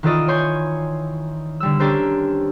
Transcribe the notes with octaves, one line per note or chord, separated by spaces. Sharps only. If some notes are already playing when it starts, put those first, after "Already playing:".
D#3 E3 F4 A4 D5 D#5
C#5 G#5 C6 G6
D3 G3 E6
C#4 D4 G4 A4 A#4 C5